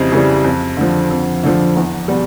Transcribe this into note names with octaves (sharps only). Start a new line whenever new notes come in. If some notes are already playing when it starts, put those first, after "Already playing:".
Already playing: F2 C#3 E3 G3 C5 D#5
C#3 E3 G3
F2
D3 F3
F2
D3 F3
E2
B2 G3